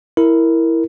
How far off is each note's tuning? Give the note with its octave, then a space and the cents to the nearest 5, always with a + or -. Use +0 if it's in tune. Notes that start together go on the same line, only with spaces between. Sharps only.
E4 +0 A#4 -5